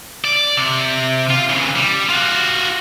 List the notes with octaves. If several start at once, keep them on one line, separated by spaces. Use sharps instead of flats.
D5
C3
F4
C#3 E3
G3
F4 F#4